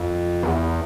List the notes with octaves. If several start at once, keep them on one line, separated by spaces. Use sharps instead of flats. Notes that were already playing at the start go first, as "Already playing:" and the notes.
Already playing: F2
E2